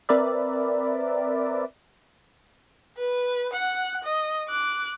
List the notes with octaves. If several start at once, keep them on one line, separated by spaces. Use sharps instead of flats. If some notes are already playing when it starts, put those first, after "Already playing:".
C4 A#4 B4 D5 E5
B4
F#5 F#6
D#5
D6 F#6